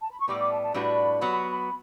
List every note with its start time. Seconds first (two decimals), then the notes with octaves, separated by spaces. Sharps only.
0.02 A5
0.11 B5
0.20 C#6
0.27 A2 G3 B3 D6
0.39 D6
0.51 A5
0.63 A5
0.74 A2 G3 D4 F#4 B4 B5
1.21 F#3 B3 F#4